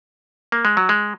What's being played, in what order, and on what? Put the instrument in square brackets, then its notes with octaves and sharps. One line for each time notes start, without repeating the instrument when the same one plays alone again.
[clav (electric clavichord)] A#3
G#3
F#3
G#3